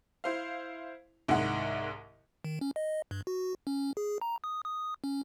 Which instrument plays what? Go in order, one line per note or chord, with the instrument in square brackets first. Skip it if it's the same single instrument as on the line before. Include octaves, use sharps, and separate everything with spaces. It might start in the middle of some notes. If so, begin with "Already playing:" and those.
[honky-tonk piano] E4 C5 F5
C2 G#2 D#3 G#3 F#5
[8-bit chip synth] D#3
C#4
D#5
G2
F#4
C#4
G#4
A#5
D#6
D#6
C#4